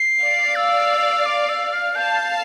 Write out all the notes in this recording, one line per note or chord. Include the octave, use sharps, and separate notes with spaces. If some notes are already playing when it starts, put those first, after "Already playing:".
Already playing: C7
D5 F5
E6
D6
E6
F6
F5 A5 G6